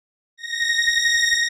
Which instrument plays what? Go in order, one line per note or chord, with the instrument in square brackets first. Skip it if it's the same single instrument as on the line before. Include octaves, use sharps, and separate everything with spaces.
[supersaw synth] A#6